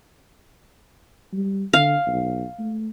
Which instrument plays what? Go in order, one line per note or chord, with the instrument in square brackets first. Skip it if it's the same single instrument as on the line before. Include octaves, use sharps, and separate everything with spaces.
[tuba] G3
[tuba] D3 [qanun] F5
[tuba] B1
A3